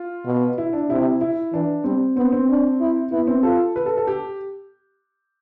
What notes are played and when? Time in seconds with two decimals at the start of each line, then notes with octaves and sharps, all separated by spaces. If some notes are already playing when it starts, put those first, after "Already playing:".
Already playing: F4
0.25 B2
0.58 E4
0.73 D4
0.89 C3 E4
1.21 E4
1.53 E3 D4
1.84 G3 C4
2.16 B3 C4
2.32 C4
2.49 D4
2.81 E4
3.12 B3 E4
3.27 C4
3.43 F4 A4
3.76 B4
3.86 A4
3.97 A4
4.07 G4